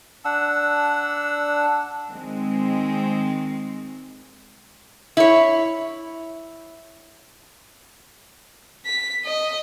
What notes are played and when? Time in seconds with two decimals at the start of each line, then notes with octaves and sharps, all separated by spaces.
0.25 D4 F#5 E6
2.09 D#3 G#3 C4
5.17 E4 C#5
8.86 B6
9.25 D#5